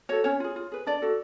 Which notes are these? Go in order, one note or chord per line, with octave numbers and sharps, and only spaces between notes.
F#4 A4 C#5
C#4 C#5
F4 G#4
F4
G#4 B4
D4 D5
F#4 A4